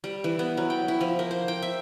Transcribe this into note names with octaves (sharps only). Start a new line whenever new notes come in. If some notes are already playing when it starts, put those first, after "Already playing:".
G3
E3
B3
F#3
G5
E4
F3
A#3
C5
G5
E5